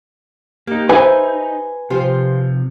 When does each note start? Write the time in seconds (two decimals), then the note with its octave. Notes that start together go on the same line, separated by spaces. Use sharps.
0.67 A#3 D#4 G4
0.89 D#4 B4 C5 D#5 E5 G#5
1.90 C3 F3 F4 G4 C5